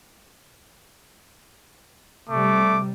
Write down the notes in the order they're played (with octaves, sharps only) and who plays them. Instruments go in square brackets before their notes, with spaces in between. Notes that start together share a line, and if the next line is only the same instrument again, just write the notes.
[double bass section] C3 G3 [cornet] A3 [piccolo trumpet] D6